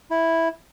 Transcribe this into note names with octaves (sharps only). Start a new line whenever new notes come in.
E4